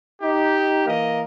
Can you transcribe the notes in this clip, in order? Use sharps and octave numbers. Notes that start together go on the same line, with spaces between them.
D#4 G4
E3 A#3 A#4 D#5